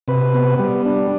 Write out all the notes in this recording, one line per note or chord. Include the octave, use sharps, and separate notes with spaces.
C3 B4
B3
G3
D4